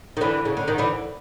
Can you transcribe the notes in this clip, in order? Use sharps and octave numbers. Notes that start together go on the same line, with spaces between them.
D#3
D3 E3
C#3
D3
D#3
D3 E3